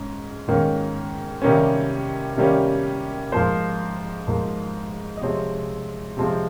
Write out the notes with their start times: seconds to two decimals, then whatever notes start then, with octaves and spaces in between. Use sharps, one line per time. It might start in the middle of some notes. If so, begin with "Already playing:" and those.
Already playing: G#2 C#4
0.48 G#2 D#3 A#3 C#4
1.42 C3 D#3 G3 A#3 C#4
2.37 C3 D#3 G3 A#3 C#4
3.32 G#2 F3 A#3 C5
4.27 G#2 F3 A#3
5.17 D#5
5.21 C3 F3 G#3 C4 C#5
6.17 C3 F3 G#3 C4